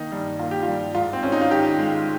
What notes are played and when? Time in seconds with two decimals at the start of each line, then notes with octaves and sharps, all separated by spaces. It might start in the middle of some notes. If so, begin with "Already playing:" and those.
Already playing: D#3 A#3 D#4
0.12 G2
0.39 A#3 F4
0.51 G4
0.62 F4
0.68 G2
0.95 G#2 F4
1.13 C4
1.23 G#1 C#4
1.32 D#4
1.41 F4
1.51 D#3 G4
1.79 G#3